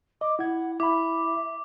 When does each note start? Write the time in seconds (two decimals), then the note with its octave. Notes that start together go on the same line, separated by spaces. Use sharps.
0.21 D#5 D6
0.39 E4 F#5 G#6
0.80 E4 E5 B5 D6